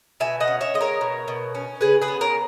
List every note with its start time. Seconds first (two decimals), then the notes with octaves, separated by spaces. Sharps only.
0.20 B2 E5 G#5
0.40 D#5 F#5
0.47 C#4
0.61 C#5 E5
0.74 G#3 D#5
0.81 A#4 C#5
1.01 B2
1.28 B2
1.55 C#4
1.81 C#3 G#4 B4
2.02 G#4 B4
2.08 B3
2.21 A#4 C#5